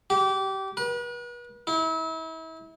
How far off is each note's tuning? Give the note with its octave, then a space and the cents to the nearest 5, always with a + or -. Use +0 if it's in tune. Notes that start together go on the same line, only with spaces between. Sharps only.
G4 -25
B4 -40
E4 -35